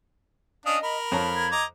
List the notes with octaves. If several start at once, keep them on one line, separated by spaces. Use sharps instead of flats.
C#4 D4 D#5 F5 D#6
A#4 B5
F2 C#5 A5 A#5
G#6
D#5 A#5 D6